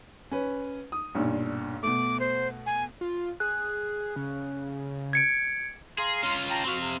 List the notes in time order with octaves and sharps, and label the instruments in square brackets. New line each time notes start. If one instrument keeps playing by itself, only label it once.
[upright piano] C#4 B4
D#6
B1 G2 A#2
[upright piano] B2 A3 [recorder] D6
[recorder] C5
G#5
[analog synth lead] F4
[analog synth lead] G#4 [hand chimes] F#6
[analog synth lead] C#3
[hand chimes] G#6 C#7 D7
[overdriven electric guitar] G#4 [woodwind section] F5 A#5 C6
[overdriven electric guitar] C#4 F4
[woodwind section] G5 A5 A#5
[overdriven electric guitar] C4 F5 [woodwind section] F#4
[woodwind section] C3